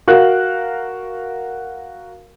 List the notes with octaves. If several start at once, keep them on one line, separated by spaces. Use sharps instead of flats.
F#4 A#4 F5 F#6